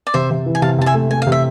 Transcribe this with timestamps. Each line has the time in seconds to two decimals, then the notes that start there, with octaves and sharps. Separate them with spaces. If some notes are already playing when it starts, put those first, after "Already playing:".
0.07 D5
0.14 C3 C5 E5
0.31 C3
0.46 E3
0.55 G#5
0.62 C3 F5 A5
0.79 C3 A5
0.86 E5 G#5
0.94 A3
1.10 A3 G#5
1.22 F5
1.27 C3
1.32 E5